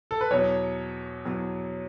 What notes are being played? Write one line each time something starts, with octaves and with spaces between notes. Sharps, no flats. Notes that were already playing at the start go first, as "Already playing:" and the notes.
A4
B4
E2 B2 F#3 C#5
E2 B2 F#3